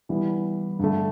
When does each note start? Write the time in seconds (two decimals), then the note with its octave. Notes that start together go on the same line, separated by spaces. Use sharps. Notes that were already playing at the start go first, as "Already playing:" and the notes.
0.09 E3 G3 B3 E4
0.79 G2 D3 A3